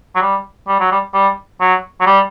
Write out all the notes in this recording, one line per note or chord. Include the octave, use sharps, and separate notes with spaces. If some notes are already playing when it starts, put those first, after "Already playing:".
F#3
G3
G3
F#3
G3
G3
F#3
F#3
G3